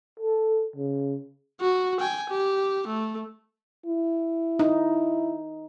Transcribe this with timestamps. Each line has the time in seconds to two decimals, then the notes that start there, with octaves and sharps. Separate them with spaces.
0.20 A4
0.76 C#3
1.60 F#4
2.00 G5 G#5
2.30 G4
2.87 A3
3.86 E4
4.59 D#4